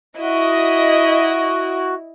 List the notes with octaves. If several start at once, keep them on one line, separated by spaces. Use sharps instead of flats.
E4 F#4 D#5